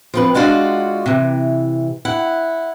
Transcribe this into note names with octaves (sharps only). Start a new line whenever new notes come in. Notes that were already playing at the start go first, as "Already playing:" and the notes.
F3 C4 B4
G#3 D4 F4 F#4 B4 F5
C3 E3
E4 F#5